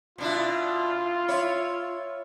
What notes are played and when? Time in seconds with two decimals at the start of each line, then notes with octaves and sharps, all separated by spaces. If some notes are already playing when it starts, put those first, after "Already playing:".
0.18 B2 D4 E4 F4
1.28 E4 C#5